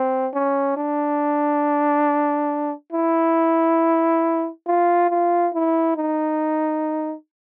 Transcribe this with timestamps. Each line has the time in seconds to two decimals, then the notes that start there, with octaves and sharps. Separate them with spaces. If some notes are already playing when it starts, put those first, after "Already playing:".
Already playing: C4
0.33 C#4
0.77 D4
2.92 E4
4.67 F4
5.09 F4
5.54 E4
5.96 D#4